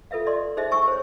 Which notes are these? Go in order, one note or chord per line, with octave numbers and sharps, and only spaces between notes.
F4 A4 B4 E5 F5
D5 D#5 C6
D#4 G#4 C5 D#5 E5
G#5 C#6 E6
C5 C#5